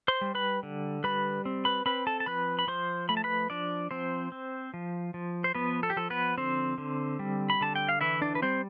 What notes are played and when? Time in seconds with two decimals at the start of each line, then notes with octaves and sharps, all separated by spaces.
0.08 C5 C6
0.21 G3
0.35 B4 B5
0.63 D3
1.04 G3 B4 B5
1.45 C4
1.65 B4 B5
1.86 C4 B4 B5
2.07 A4 A5
2.20 A5
2.26 F3 B4 B5
2.59 B5
2.67 F3 C5 C6
3.09 A3 B5
3.17 A5
3.24 B4 B5
3.50 F3 D4 D5
3.91 F3 C4 C5
4.32 C4
4.74 F3
5.14 F3
5.44 C5
5.55 F3 B3 B4
5.83 A4
5.90 G4
5.97 F3 A4
6.10 B3 B4
6.38 D3 C4 C5
6.78 D3
7.19 G3
7.50 B5
7.61 D3 A5
7.75 G5
7.89 F5
8.01 E3 E4 E5
8.22 D4 D5
8.35 B4
8.42 G3 C4 C5